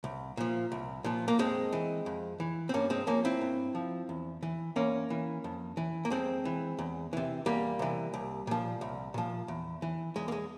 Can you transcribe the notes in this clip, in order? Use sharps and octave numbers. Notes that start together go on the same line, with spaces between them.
C2
A#2 F3
C2
A#2 F3
A#3
F2 G#3 C4
E3
F2
E3
C4
G2 A#3 C#4
G#3 C4
F3 A#3 C#4
C4 E4
G2
F3
E2
E3
E2 A#3 C#4
E3
F2
E3
A#3
F2 G#3 C4
E3
E2
C3 E3
E2 G3 A#3
C3 E3
C2
A#2 F3
C2
A#2 F3
E2
E3
E2 G#3
A#3
G#3